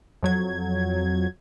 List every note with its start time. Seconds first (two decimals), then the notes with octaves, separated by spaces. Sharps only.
0.23 F2 F#3 G#6